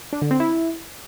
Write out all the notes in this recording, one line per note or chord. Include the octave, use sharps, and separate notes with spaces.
D4
D3
C4
E4